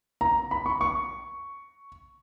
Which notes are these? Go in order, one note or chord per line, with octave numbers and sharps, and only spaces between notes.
A#5
B5
C#6
C#6